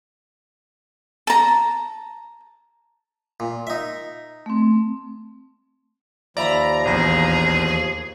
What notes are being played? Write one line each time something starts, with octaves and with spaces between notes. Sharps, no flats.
A5 A#5
A#2
D#4 E5
A3 C4
D#2 F3 D5 E5 A#5 B5
A#1 E2 G#4 A#6